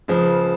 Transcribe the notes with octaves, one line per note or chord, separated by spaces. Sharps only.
C#2 C#3 F3